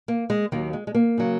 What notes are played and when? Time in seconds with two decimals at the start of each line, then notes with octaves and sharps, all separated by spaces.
0.08 A#3
0.30 G#3
0.52 D#2 D#3 F#3 A#3
0.73 G#3
0.87 G#3
0.95 A#3
1.18 C#3 F#3